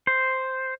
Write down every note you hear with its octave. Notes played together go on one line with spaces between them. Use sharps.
C5